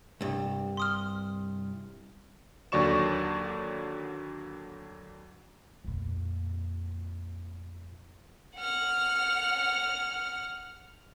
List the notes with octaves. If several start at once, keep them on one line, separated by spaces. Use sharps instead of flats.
C2 G2
C6 D#6 F6
D#2 D3 F#3 D5 C#6 E7
F2 A#2
F#5 F6